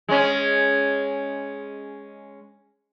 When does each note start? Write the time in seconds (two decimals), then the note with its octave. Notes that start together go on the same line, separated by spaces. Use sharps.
0.09 G#3 C#4